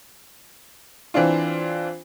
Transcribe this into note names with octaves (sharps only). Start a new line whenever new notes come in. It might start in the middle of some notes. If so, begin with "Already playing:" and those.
E3 C4 D4 F4